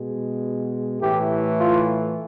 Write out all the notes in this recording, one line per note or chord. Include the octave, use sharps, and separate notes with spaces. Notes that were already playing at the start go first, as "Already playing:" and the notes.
Already playing: B2 G#3
A2 E3 A3 G4
F4